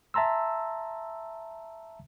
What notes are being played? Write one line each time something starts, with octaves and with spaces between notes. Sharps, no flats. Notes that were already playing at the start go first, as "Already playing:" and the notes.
E5 A5 A#5 C6 E6